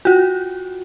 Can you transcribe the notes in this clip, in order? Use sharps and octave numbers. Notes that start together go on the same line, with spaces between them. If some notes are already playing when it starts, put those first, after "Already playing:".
F4 F#4